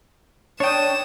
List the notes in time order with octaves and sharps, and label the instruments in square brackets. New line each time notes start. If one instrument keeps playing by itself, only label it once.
[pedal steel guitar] D4 [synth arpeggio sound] C#5 G5 [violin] D#6 E7